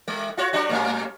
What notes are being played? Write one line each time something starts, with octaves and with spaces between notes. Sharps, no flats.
G3
F4 F#4 C#5
G3 D4 F#4
A2 G3 C#4